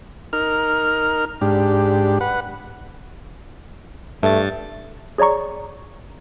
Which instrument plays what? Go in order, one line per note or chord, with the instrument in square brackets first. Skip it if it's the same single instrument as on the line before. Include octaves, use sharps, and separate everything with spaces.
[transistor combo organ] D#4 A#4 F6
G#2 D4 G4
B4 F#5
[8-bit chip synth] G2 A6 [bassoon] A3
[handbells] G#4 C#5 D5 A#5 C#6